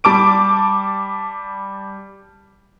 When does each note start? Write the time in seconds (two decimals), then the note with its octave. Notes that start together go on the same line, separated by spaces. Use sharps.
0.04 G3 A5 D6 D7